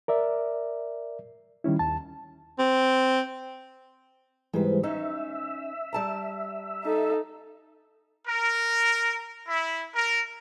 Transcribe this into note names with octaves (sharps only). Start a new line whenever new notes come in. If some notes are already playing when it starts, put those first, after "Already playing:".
A#4 D5 E5
D#3 G3 C#4 E4
D#2 A5
C4
G#2 E3 G3 G#3 B4 C5
C#4 D#4 E5
G3 A5 A#5
D#4 A4
A#4
E4
A#4